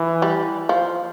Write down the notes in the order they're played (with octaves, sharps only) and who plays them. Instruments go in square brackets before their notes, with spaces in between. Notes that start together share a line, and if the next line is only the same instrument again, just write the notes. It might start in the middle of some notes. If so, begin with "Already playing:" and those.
Already playing: [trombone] E3
[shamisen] G3
F3